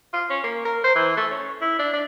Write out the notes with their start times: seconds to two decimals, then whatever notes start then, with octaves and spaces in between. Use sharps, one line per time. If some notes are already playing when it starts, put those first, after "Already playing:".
0.13 F4
0.30 C#4
0.44 A#3
0.65 A#4
0.84 C5
0.95 E3
1.17 A3
1.31 C#4
1.61 E4
1.79 D4
1.94 D4